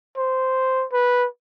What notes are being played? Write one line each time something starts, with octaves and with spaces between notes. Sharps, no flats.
C5
B4